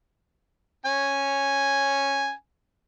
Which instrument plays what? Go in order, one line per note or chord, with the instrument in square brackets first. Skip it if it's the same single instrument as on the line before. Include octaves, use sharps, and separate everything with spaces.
[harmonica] C#4 G#5